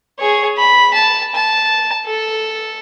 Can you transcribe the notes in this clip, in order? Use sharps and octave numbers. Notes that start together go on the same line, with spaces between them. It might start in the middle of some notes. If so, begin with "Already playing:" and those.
G#4 C#5
B5
A5
A5
A4